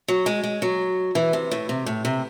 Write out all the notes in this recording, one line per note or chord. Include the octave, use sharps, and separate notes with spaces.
F#3
G#3
G#3
F#3
E3
C3
A2
C3
A2
C3